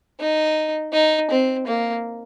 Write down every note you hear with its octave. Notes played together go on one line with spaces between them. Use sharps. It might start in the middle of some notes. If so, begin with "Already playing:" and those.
D#4
D#4
C4
A#3